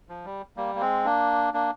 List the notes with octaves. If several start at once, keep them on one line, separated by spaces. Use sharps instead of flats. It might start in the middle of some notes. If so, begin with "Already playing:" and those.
F3
G3
G3 A#3
A#3
G#3 C4
A#3 D4
A#3 D4